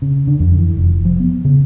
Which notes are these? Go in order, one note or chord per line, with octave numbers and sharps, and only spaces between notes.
C#3
D3
F2
E3
F1
F3
B3
C#3